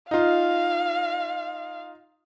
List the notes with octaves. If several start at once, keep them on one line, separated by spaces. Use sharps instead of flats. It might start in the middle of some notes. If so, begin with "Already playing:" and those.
D#4 F4 F5